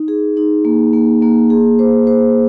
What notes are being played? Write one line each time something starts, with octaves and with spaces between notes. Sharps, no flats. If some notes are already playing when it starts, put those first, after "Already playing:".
Already playing: D#4
G#4
D#4
A#3
A#3
A#3
G#4
C5
C5